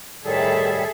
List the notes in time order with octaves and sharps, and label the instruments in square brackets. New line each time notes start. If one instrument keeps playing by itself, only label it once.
[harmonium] A2 D#3 G3 [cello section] G#4 A4 E5